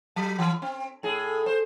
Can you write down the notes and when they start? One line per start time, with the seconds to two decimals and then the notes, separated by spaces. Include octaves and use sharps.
0.16 F#3
0.39 E3
0.62 C4
1.03 A2 G#4
1.46 C5